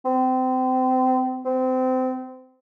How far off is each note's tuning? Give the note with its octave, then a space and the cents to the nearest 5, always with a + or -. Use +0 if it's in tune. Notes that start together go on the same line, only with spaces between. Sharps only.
C4 -30
C4 -25